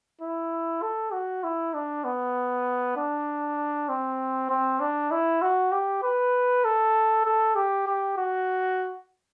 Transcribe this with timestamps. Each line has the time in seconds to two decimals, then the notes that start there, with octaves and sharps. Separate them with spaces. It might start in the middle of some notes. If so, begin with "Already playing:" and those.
0.21 E4
0.82 A4
1.13 F#4
1.44 E4
1.74 D4
2.05 B3
2.97 D4
3.89 C4
4.50 C4
4.80 D4
5.11 E4
5.42 F#4
5.72 G4
6.03 B4
6.65 A4
7.25 A4
7.56 G4
7.87 G4
8.17 F#4